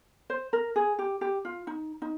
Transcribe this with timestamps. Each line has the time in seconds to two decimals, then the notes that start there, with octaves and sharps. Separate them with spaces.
0.30 C5
0.53 A#4
0.76 G#4
0.99 G4
1.21 G4
1.45 F4
1.67 D#4
2.02 D#4